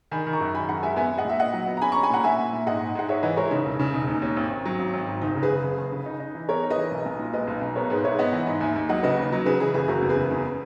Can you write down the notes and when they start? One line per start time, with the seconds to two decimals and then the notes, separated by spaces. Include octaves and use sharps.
0.11 D#3 G#5 B5
0.27 D#3
0.33 A#5 C#6
0.40 F#2
0.54 D#3 G#5 B5
0.69 F#2 F#5 A#5
0.83 G#3 E5 G#5
0.96 B3 E5 G#5
1.12 B3
1.18 D#5 F#5
1.25 A#2 E5
1.39 A#2 D#5 F#5
1.54 F#3
1.67 B3
1.77 A#5
1.81 C#4 G#5 B5
1.92 C#4 A#5 C#6
2.03 G#5 B5
2.10 A#2 F#5 A#5
2.24 A#2 E5 G#5
2.39 A#2
2.53 A#2
2.67 G#2 D#5 F#5
2.81 G#2
2.95 G#2 F#5
3.09 G#2 C#5 E5
3.23 E3 B4 D#5
3.37 G#3 A#4 C#5
3.45 E4
3.51 C#3 D#4
3.66 E1
3.80 C#3
3.94 E1 D#4
4.08 D#2 D#4
4.22 D#2 C#4
4.37 G#1
4.51 G#1
4.65 F#3
4.79 G#1
4.94 G#1
5.07 G#2
5.21 F#1 D#4
5.36 C#3
5.43 G#4 B4
5.50 F#1
5.63 F#1
5.78 F#1
5.92 C#3
6.06 D#4
6.20 D#4
6.35 E3
6.49 B3 A#4 C#5
6.63 D#4
6.70 B4 D#5
6.78 E3
6.91 B1
7.06 B1
7.20 A#2
7.33 G#3 B4 D#5
7.47 B1
7.61 B1
7.76 B3 A#4 C#5
7.90 G#2 G#4 B4
8.04 G#2 C#5 E5
8.19 B3 D#5 F#5
8.33 E3
8.47 G#2
8.61 D#2 E5 G#5
8.76 D#2
8.89 F#3 D#5 F#5
9.03 C#3 B4 D#5
9.17 D#2
9.32 F#3
9.45 C#3 G#4 B4
9.60 E3 G#4 B4
9.74 F#1 G#4 B4
9.88 F#1 F#4 A#4
10.02 E2
10.09 G#4 B4
10.16 C#3
10.31 E2